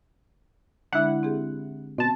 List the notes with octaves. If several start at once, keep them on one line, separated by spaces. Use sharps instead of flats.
D3 G#3 D4 E4 F#5
C4 G4 G#4
B2 C4 A5